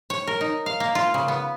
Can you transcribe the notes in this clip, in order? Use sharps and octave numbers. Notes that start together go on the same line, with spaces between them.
C#5
A#4
D#4
F5
A#3
F4
C#3
B3